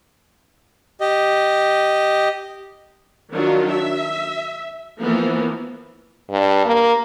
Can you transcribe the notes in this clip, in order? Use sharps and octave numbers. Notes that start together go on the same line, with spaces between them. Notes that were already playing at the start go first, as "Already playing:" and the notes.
G4 D#5
D#3 F#3 D4 F4
E5
E3 F3 A#3 B3
G2
A#3